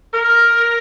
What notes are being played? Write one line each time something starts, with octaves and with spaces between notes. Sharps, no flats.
A#4